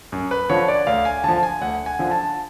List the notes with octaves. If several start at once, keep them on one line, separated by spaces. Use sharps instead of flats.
F#2
B4
D3 F3 C#5
D5
D2 F5
G#5
D3 F3 A5
G#5
D2 F#5
G#5
D3 F3
A5